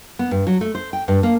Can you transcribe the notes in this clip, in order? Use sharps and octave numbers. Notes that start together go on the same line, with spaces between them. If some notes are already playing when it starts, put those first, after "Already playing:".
B3
G2
F#3
A3
C5
G5
G2
A#3